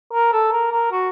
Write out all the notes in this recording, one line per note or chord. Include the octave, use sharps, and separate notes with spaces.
A#4
A4
A#4
A#4
F#4